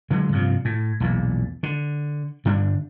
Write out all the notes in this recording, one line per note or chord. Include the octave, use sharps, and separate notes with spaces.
D3 F#3 G#3
G2 C3 F3
A2
B1 E2 A#2
D3
G2 D3 G3 D4